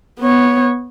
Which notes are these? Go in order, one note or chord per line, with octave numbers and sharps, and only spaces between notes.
B3 C#5